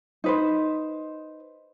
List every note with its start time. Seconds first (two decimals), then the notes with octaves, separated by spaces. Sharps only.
0.24 D#4 B4 C5